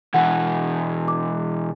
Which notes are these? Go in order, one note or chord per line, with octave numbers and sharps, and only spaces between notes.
B2 E3 F#4 F#5
D6